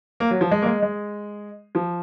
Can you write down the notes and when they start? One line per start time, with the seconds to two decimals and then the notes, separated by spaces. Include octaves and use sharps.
0.20 A#3
0.31 F#3
0.41 F3
0.51 G#3
0.62 A#3
0.66 G#3
0.82 G#3
1.75 F3